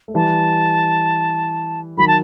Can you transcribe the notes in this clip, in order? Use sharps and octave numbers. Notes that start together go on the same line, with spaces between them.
A3
E3 G3 A5
D#3 F#3 B5
A5